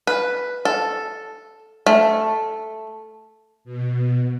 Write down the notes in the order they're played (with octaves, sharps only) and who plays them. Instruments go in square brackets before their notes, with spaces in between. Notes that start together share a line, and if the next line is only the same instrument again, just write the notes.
[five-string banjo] B4
A4
A3
[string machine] B2